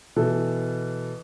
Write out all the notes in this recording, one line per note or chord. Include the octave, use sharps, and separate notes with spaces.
B2 E3 A4